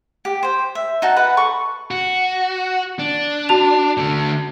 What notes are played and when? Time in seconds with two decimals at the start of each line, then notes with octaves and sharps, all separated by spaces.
0.25 G4
0.43 C5 G5
0.75 E5
1.02 D#4 F#4 A5
1.16 B4 F#5
1.37 A4 B5 C#6
1.91 F#4
2.99 D4
3.49 F#4 A5 F7
3.97 D3 A3